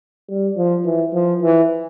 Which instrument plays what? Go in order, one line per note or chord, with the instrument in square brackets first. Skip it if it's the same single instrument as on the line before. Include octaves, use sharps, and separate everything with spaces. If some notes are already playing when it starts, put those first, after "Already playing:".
[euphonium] G3
F3
E3
F3
E3